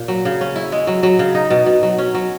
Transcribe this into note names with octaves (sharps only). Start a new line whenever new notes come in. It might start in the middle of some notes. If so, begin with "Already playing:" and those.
Already playing: A#2
F#3
C#3
C#4
E4
G#3
F#3
F#3
C#3
D#4
B2
B2
F#3
C#4
F#3